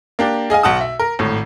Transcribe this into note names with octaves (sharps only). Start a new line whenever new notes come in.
A#3 D4 G4
G#4 D#5 F5 G#5
B1 F#5 A5 D#6
E5
A#4
G#1 A2